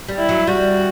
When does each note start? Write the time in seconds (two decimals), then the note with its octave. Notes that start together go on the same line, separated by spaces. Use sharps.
0.08 G3
0.18 E4
0.29 F#3
0.47 G3 F#4